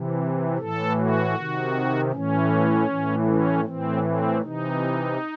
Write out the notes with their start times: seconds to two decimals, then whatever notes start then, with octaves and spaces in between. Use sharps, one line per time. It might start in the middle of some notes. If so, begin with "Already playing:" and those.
Already playing: C3 E3
0.59 A2 E3 A4
0.97 F#4
1.35 C3 D#3
2.12 A2 E3 C#4
2.88 A2 E3
3.26 C#4
3.65 A2 E3 C4
4.03 C4
4.41 C3 E3 D#4